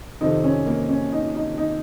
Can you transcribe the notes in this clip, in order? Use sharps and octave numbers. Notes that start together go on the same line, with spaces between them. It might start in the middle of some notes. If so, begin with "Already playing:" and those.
F2 C3 D#3 D#4
C#4
A#3
C#4
D#4
D#4
D#4